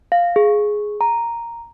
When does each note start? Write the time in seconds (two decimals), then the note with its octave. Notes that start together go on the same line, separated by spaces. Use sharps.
0.12 F5
0.36 G#4
1.01 A#5